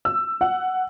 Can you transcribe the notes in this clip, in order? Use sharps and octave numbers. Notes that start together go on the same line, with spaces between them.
E6
F#5